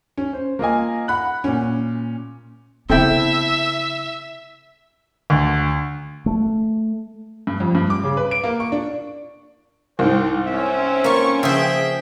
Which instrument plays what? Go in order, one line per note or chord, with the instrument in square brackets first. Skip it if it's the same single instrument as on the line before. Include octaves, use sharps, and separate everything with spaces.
[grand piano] C#4
C5
A#3 F4 D#5 G#5
F#5 B5 F#6
A#2 C#4
[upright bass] C#3 B3 [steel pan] C4 G5 [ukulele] E4 A4 [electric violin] E5
[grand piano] D2
[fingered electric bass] A3
[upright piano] G2
F2
G2
D6
C#3
B4
D7
A#3
C#6
D4
[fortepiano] C2 G#2 [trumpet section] C4 C5 G5
[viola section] C4 C#4 [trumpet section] E5
[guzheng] A#3 F4 [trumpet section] C#6
[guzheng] C#3 F3 [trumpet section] G#4 E5 [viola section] G5